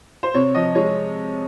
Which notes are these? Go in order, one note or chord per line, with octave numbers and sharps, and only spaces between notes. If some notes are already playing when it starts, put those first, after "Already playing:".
C5
C3 C#5
F3 D#5
G#3 C#5